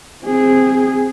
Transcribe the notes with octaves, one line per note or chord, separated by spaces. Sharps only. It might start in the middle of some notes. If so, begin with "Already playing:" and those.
C4 G#4